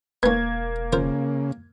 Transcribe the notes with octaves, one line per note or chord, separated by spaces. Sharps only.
E1 A#3 B3 C#4 G#6
C#3 F3 A#4 C5